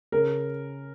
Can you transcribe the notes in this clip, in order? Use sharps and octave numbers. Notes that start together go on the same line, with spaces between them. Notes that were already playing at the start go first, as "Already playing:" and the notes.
C#3 A#4